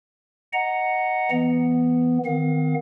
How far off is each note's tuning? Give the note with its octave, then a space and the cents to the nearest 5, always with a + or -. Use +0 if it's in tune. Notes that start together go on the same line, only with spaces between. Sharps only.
D#5 +0 F#5 +0 A#5 +0
E3 +10 B3 +0
D#3 +0 C4 -45 F5 +40